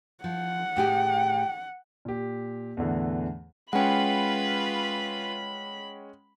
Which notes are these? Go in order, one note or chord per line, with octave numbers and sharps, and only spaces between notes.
F3 F#5
A2 G4 G#4 G5
A#2 G4
E2 A2 D3 E3
G#3 C#4 F4 B4 F#5 G5 B5